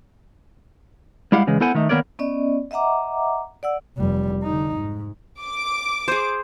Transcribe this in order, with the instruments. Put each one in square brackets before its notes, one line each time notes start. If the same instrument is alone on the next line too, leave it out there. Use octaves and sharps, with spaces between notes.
[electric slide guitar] G3 G#3 E4 G4 F5 F#5
C#3 E3 G#3
B3 E4 A4 C5 F#5 G#5
D#3 A3 D#4
D#3 A#3 B3 A#4 C#5 D5
[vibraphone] B3 C#4 D5 D#5
D#5 E5 F#5 A#5 D6
D5 F#5 E6
[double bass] F1 G3
D3 D#4
G#2
[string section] D6
[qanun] G#4 C5